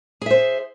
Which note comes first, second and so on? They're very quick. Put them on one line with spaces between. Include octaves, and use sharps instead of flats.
G#4 E5 C5